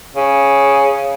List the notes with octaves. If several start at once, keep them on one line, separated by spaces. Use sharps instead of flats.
C#3